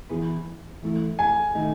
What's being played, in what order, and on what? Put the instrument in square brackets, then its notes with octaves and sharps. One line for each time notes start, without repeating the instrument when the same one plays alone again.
[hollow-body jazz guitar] E3 B3 E4 G#4 B4
E3 A3 E4
[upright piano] G#5
[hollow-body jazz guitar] D#3 A3 D#4